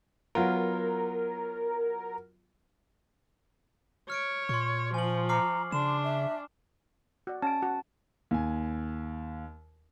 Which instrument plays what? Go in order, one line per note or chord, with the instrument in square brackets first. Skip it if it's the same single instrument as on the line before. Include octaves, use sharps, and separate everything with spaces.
[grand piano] F#3 B3 F4 [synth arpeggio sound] A#4
[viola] C#5 [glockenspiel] F6 C#7 D7
[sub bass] A#2 [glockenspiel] C6 C#6
[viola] F3 [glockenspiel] G#5 F#7
[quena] A#5 [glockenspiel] D6 F6 C7
[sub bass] C#3 [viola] D4 [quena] C6 [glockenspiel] E7
[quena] E5
[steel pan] F#4 D5
[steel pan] C#4 [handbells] A5 D7
[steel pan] F#4
[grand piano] D#2 G#5